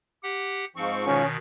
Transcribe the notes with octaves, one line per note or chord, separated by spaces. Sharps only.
G4 F#5
G#2 F3 C4 C#6
B2 D#3 C#4